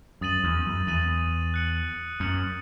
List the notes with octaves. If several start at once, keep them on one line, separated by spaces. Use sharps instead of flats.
F#2 D#6 A6 D#7 F#7
E2
F#2
E2 D#6 A6 D#7 F#7
F#6 C#7 F#7
F#2 F#6 C#7 F#7